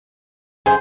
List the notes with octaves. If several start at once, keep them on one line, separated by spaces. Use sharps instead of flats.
F#2 G#4 C5 G#5